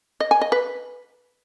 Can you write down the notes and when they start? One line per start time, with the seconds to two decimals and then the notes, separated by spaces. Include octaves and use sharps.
0.20 D#5
0.31 G#5
0.41 D#5
0.52 B4